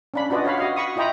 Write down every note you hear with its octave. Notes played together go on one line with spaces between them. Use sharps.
C#4 D4 B5
D4 F4 F#4 B4 D5 D#5
F#4 C#5 F5 B5
F#4 D#5 F5
B5 C#6 D#6
E4 F4 D#5 G5 A#5 B5